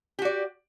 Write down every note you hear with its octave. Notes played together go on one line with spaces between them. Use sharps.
F#4 G4 D5